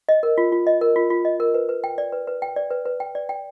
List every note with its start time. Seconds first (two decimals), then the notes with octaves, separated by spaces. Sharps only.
0.09 D#5
0.23 A#4
0.38 F4
0.52 F4
0.67 D#5
0.81 A#4
0.96 F4
1.10 F4
1.25 D#5
1.40 A#4
1.54 B4
1.69 B4
1.84 G5
1.98 D5
2.12 B4
2.27 B4
2.42 G5
2.56 D5
2.71 B4
2.85 B4
3.00 G5
3.15 D5
3.29 G5